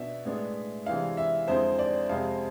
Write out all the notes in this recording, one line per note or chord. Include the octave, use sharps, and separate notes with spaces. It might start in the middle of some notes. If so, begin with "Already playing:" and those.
Already playing: B2 B3 D4 E5
A2 G#3 B3 D4
C3 E3 G#3 D4 F5
E5
F2 D3 G#3 C4 E4 C5
D5
F2 C3 G#3 C4 F5